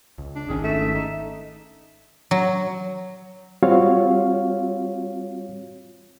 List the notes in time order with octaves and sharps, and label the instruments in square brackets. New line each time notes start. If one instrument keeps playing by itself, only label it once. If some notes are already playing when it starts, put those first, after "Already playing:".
[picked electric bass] C#2
[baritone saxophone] D4
[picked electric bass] G#1 D#3 C#4 [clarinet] G#4
[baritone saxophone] A3 [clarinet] E5
[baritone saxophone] D#4
[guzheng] F#3
[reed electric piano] G3 C4 F4 F#4 C#5 F5